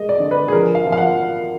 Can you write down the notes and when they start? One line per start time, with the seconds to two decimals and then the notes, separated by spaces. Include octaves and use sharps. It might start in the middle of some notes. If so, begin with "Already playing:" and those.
Already playing: G#3 D#5
0.09 D5
0.20 D3
0.31 B4
0.48 G#4
0.52 F3 A#4
0.75 F5
0.86 F3
0.92 F5
0.97 F#5